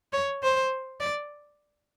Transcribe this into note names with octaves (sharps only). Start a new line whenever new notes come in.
C#5
C5
D5